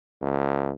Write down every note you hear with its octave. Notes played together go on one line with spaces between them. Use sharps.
C#2